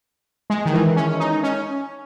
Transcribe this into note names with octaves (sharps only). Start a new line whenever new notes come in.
G#3
D#3
E3
C#4
D#4
C#4